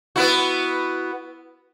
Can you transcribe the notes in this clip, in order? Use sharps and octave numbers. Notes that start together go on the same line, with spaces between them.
B3 E4 F#4